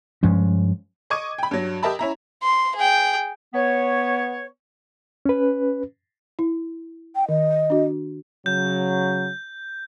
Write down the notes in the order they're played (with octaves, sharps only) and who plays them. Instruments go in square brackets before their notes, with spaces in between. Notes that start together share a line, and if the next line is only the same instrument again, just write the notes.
[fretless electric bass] G2 F3 G#3 C#4
[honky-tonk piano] D#5 C#6 D6 G#6 D#7
G5 B5
G2 F#3
G4 A#4 D#5 E5 A5 B5
C#4 E4 A#5
[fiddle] C6
G#4 G5
[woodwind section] B3 C#5
[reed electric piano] C#4 B4
[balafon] E4
[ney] G5
[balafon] D#3 [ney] D#5
[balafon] D4 F#4
[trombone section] C#3 F#3 [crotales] G6